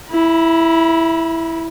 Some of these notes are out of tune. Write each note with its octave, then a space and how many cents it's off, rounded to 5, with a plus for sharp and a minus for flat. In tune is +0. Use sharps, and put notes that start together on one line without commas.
E4 +0 B5 -40